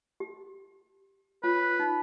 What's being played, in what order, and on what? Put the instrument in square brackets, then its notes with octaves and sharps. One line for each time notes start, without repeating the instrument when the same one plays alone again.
[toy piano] G4
[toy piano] F4 C#5 [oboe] B4
[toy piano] D#4